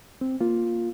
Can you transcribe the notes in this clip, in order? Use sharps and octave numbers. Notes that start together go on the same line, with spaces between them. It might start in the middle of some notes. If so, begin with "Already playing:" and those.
C4
A#3 F4